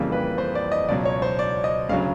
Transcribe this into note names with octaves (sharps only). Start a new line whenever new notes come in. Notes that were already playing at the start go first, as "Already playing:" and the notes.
Already playing: F2 C#3 E3 G3 A#3
B4
C5
D5
D#5
C#2 B2 F#3 D5
C#5
C5
D5
D#5
D2 C#3 F#3 F5